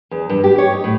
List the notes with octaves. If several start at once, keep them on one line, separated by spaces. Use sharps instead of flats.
E2
G2
G4
C#5
D#4
A2